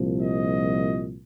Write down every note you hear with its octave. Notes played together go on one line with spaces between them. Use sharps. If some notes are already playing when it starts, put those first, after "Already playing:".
Already playing: C2 A#2 F3
D#5